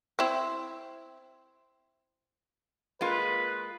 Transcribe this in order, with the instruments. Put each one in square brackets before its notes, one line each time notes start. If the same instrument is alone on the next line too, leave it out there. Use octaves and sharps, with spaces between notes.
[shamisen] C4 E4
[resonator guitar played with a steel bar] G#3 A#3 F4 [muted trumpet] B4